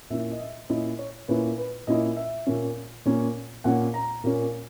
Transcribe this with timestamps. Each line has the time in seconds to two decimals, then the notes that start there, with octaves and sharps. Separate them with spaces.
0.10 A#2 A#3 C#4 E4 E5
0.31 D#5
0.39 E5
0.69 A#2 A#3 C#4 E4 D#5
0.99 C#5
1.28 A#2 A#3 C#4 E4 B4
1.58 B4
1.87 A#2 A#3 C#4 E4 D#5
2.17 E5
2.47 A#2 A#3 C#4
3.05 A#2 A#3 C#4
3.64 A#2 A#3 C#4 F#5
3.94 A#5
4.24 A#2 A#3 C#4